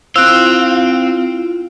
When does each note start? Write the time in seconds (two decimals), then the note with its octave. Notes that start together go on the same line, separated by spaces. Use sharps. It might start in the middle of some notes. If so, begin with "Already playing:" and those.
0.16 C4 E4 F4 C5 F5 E6 F#6